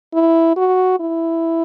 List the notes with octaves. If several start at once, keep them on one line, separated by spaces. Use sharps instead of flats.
E4
F#4
E4